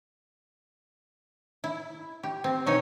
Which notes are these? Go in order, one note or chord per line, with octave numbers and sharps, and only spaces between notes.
E4
G4
C4
B2 D#4 C#5 G#5